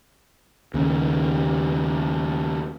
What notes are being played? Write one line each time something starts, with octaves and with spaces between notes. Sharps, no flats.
D#2 C#3